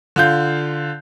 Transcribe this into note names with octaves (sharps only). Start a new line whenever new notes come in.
D3 F4 G6